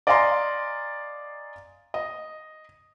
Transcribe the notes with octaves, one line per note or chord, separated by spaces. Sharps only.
D5 D#5 F5 G#5 A#5 C6
D#5